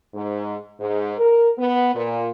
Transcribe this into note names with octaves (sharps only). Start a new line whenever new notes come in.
G#2
G#2
A#4
B3
A#2